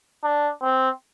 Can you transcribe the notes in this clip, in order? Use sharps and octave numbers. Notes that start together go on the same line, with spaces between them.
D4
C4